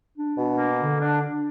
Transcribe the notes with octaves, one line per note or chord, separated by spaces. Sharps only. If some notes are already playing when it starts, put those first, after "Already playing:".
D4
B2
A#3
D3
D4
D4